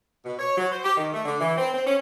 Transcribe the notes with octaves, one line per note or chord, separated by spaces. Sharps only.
B2
C#5
F#3
C5
G4
D#3
A3
D3
E3
C4
C4
C#4